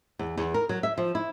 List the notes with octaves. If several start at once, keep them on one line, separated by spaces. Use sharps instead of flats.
E2
E2
A#4
F#3
E5
F3
E4